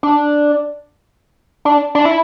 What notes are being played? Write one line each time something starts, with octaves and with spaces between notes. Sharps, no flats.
D4
D4
D4
E4